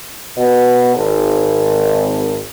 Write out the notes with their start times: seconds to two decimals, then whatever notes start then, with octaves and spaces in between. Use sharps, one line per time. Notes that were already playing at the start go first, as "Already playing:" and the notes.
0.38 B2
0.96 G#1